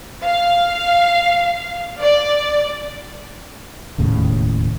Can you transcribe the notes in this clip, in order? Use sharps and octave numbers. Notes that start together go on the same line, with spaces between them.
F5
D5
E1 D#2 A2 C#3